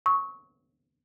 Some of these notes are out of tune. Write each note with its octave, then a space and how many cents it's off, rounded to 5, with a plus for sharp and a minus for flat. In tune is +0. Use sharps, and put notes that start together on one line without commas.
C#6 +0 E6 -40